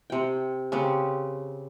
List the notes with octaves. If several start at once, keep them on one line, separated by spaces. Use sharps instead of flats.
C3 G5
C#3 C4 G4 B4